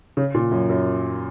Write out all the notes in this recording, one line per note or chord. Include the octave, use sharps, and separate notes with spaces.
C#3
A#2
F#2
F#2